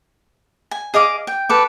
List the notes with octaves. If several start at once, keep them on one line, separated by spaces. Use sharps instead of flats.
G#5
G#4 D#5 F5 D6
G5
A4 B4 D6